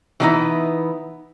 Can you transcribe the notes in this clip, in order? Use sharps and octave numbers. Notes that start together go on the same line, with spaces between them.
E3 G#3 A#3 B3 D#4 E4